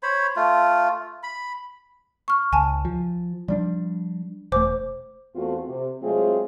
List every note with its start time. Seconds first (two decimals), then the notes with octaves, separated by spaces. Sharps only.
0.03 C5 C#5 B5
0.36 A3 F4
1.23 B5
2.28 C#6 F6
2.53 C#2 G#5 A5
2.85 F3
3.48 F3 G3 D4 D5
4.52 E1 A3 C5 D6
5.35 E2 A3 C4 F4 F#4
5.68 C3
6.02 F#3 G#3 A3 C4 F4 G#4